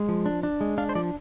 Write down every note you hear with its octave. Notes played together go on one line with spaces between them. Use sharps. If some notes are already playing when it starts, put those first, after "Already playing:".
Already playing: G#3
F3
D4
D4
G#3
D4 F5
C5
F3 D5